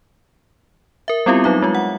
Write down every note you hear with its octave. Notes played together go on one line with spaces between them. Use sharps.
A#4 E5
G3 B3 C4 E4 F4 G4
F#3 D#4 E5
G#3 F4
F#5